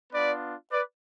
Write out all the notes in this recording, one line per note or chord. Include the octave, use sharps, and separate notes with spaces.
B3 D4 F4 B4 D5
B4 D5